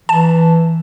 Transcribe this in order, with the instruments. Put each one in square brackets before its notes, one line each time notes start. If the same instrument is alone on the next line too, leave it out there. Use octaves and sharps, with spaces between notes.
[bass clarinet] E3 [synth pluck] A5